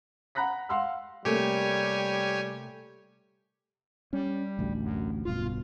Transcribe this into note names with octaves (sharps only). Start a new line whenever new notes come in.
F#5 A#5 B5 F#6 A#6 B6
F5 F#5 C6 E6 F6
C3 G3 A3 A#3 G4 C#5 G#5
G3 C#4
A1 D2
F#2
D1 G2 B2 F4